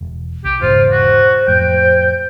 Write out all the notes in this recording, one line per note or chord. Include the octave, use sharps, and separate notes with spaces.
E1
C2 G4
E1 G#2 C#3 F4 C5
F#4
F2 A2 G5